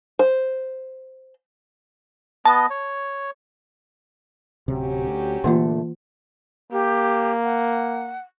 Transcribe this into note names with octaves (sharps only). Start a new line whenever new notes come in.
C5
B3 D#5 A5
C#5
D1 C3 F#3 C#4 G4
D2
A#2 D3 E3 A3 A#3 F4
A#3 G4
F#5